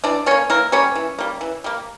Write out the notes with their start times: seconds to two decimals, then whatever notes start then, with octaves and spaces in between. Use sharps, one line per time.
0.04 E3 D4 D5
0.26 G3 A#3 C#4 C#5
0.50 E3 A#3 A#4
0.72 G3 A#3 C#4 C#5
0.95 E3
1.19 G3 A#3
1.41 E3
1.64 G3 A#3